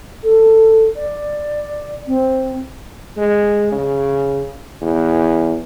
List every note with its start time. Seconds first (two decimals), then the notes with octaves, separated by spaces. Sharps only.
0.24 A4
0.96 D5
2.07 C4
3.17 G#3
3.72 C#3
4.81 E2